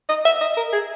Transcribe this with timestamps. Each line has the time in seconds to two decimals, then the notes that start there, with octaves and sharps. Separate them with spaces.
0.09 D#5
0.26 E5
0.41 D#5
0.57 A#4
0.73 G#4